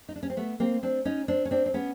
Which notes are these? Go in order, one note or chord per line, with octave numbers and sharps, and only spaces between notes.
D#4
D4
C#4
C4
A3 B3
A#3 C4
C4 D4
C#4 D#4
C4 D4
C#4
C4 D4
C4
B3 C#4